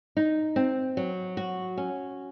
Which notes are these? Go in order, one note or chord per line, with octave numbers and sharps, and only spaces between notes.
D#4
C4
F#3
F#4
C#4